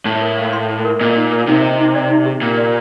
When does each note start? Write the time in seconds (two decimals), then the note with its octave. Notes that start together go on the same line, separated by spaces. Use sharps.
0.05 A2 A5
0.22 A#4
0.38 F5
0.53 C6
0.69 A5
0.85 A#4
1.00 A#2 D#5
1.16 D#4
1.32 A#4
1.47 C3 D#4
1.63 D#5
1.79 D#4
1.94 D5
2.10 D#4
2.26 G4
2.41 A#2 G5
2.57 D5